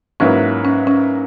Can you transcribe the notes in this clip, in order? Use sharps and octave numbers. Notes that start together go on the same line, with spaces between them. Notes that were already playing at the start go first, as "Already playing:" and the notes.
G#2 F#3 A#3 C#4 E4 B4
C#4
C#4